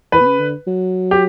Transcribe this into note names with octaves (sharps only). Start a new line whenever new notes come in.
E3 B4
B2
C#3
D3
F#3
G4